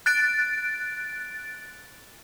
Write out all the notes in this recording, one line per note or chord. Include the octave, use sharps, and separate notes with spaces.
F#6 A6 D7